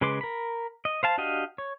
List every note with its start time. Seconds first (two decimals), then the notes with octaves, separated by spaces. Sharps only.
0.01 C#3 G#3 B4 C6 D6
0.21 A#4 B5
0.85 D#5
1.03 C5 F5 A5
1.18 D4 F#4 G4 D#5 F5
1.58 C#5